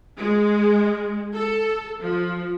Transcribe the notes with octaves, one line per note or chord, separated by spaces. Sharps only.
G#3
A4
F3